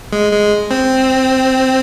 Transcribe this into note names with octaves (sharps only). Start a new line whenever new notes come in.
G#3
G#3
C4